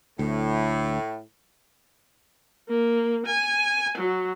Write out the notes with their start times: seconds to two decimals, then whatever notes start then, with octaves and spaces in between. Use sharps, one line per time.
0.19 D2 A2
2.69 A#3
3.26 G#5
3.98 F#3